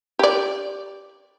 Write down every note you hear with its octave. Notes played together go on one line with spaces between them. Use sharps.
G4 D5